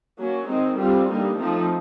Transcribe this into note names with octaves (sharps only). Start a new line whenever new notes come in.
F#3 A#3 C#4
D#3 G#3 C4 D#4
D3 G3 C4 F4
D3 G3 A#3 D#4
F3 A3 C4 D#4